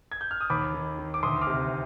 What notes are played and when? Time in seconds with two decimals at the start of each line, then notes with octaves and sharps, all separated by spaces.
0.12 G#6
0.21 G6
0.31 F6
0.41 D#6
0.50 D#2 B5 D6
0.74 D#3
0.99 D#3
1.14 D6
1.23 D2 C6 D#6
1.41 D6 F6
1.47 C3